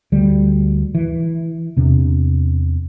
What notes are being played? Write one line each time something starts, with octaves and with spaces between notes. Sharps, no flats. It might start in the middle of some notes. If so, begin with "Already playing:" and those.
D2 G3
E3
E2 C3 D4